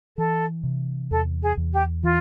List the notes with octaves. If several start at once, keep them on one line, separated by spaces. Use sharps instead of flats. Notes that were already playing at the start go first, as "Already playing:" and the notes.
E3 A4
C3
E2 A4
G#4
E2
G4
E3 F4